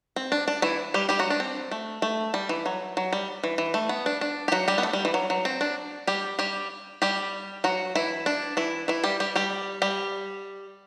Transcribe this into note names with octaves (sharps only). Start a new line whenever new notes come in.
C4
D4
D4
E3 E4
G3 G4
G3 G4
F#3 F#4
D4
C4
A3
A3
G3
E3
F#3
F#3
G3
E3
E3
A3
B3
D4
D4
G4
F#3 F#4
G3 G4
B3
A3
G3
E3
F#3
F#3
C4
D4
G3 G4
G3 G4
G3 G4
F#3 F#4
E3 E4
D4
E3 E4
E3 E4
G3 G4
G3 G4
G3 G4
G3 G4